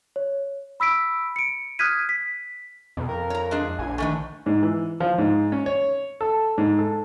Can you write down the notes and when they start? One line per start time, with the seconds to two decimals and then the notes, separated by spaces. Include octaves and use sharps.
0.16 C#5
0.80 B5 E6 B6 D7
1.36 C#7 D7
1.79 D#6 F6 F#6 G#6 B6 D#7
2.09 B6
2.97 F2 B2
3.09 A#4
3.30 C#5 A#5
3.51 G#3 D4 G#4
3.79 A#1 G#5
3.98 D3 D#3 A3 G#5
4.46 G#2
4.63 E3
5.00 F3
5.18 G#2
5.52 C#4
5.66 C#5
6.21 A4
6.58 G#2
6.78 A4